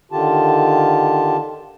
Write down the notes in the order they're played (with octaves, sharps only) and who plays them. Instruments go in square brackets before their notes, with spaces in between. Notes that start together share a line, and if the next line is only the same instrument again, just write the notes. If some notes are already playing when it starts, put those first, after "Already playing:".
[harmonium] D3 D#3 F4 G4 A5